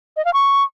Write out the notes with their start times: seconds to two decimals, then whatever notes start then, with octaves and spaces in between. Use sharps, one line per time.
0.17 D#5
0.25 F5
0.33 C#6